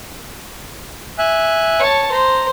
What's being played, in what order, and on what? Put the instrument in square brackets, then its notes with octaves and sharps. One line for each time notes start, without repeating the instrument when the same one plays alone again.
[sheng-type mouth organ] E5 G#5 F#6
[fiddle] C#5 A5
[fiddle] C5 [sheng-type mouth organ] A#5